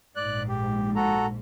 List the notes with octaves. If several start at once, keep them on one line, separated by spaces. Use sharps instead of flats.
A#1 G#2 D5 F#6
G4
F#4 A4 A#5